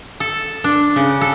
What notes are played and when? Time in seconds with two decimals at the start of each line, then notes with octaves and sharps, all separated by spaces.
0.20 A4
0.64 D4
0.96 C#3
1.21 A4